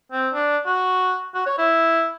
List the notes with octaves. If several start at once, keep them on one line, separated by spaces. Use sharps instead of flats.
C4
D4
F#4
F#4
C#5
E4